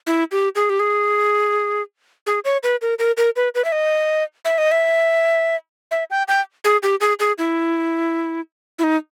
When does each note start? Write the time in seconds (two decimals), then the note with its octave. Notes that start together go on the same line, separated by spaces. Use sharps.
0.07 E4
0.32 G4
0.55 G#4
0.70 G4
0.80 G#4
2.27 G#4
2.45 C#5
2.63 B4
2.82 A#4
2.99 A#4
3.17 A#4
3.36 B4
3.55 B4
3.65 E5
3.72 D#5
4.45 E5
4.58 D#5
4.71 E5
5.91 E5
6.10 G5
6.28 G5
6.64 G#4
6.83 G4
7.01 G#4
7.19 G#4
7.38 E4
8.79 E4
8.84 D#4